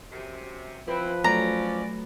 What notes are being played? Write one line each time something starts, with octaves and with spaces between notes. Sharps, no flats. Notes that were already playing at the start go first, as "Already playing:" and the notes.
F#2 C3
F3 C4 E4 B4
F#3 A3 C#4 D5 A#5